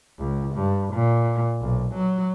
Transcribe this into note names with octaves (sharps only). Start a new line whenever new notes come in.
C#2
G2
A#2
B1
F#3